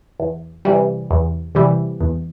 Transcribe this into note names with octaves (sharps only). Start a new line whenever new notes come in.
E2
C3 E3 G3
E2
C3 E3 G3
E2